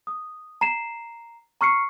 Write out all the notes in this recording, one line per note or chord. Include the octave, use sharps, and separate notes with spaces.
D#6
A#5 C7 E7
A#5 C#6 F6 C7 C#7